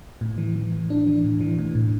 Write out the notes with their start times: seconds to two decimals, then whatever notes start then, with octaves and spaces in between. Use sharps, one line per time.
0.21 A2
0.38 E3
0.56 E3
0.72 A2
0.90 D4
1.07 E3
1.24 A2
1.41 E3
1.59 A2
1.75 A2